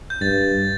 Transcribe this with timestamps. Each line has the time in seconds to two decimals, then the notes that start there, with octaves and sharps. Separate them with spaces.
0.10 G6
0.21 G2 A6